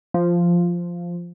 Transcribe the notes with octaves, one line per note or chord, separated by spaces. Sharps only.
F3